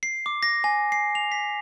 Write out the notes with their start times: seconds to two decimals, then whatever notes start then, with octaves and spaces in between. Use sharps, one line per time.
0.03 C7
0.26 D6
0.43 A#6
0.64 G#5
0.92 C7
1.15 F7
1.32 B6